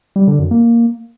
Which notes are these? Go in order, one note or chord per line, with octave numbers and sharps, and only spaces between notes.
G3
D3
F#2
A#3